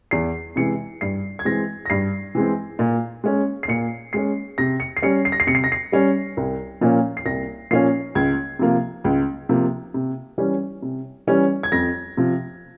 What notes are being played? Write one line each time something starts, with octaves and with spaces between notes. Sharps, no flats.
E2 C7
C3 E3 G#3 C#7
G2 C7
G#6
E3 G#3 C4 A#6
A#6
G2 C7
E3 G#3 C4
A#2
G#3 C#4
C7
A#2 C#7
G#3 C#4 C7
C3 A#6
C#7
C7
G3 C#4 C#7
C7
A#6
C7
C3 C#7
C7
A#6
C7
G3 C#4
C2
A#2 F3 A#3 C#4
C7
C2 A#6
A#2 F3 A#3 C#4 C7
C#2 G#6
C3 F3 A#3
C#2
C3 F3 A#3
C3
E3 G3 C#4
C3
E3 G3 C#4
G#6
F2 A#6
C3 F3